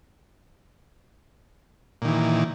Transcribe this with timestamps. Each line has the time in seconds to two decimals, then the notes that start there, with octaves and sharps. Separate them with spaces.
2.02 A#2
2.05 D#3
2.08 E3